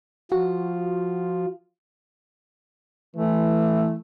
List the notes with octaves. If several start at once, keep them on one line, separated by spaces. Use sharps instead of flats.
F3 F4 F#4
E3 A3